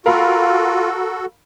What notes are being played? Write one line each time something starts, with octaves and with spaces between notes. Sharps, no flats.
F4 F#4 A4 A#4 F5 B5